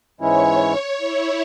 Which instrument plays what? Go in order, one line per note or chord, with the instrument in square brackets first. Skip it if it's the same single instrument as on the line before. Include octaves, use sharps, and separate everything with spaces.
[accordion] G#2 E3 G#3 C#4 E4 [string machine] C#5
[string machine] C#5
E4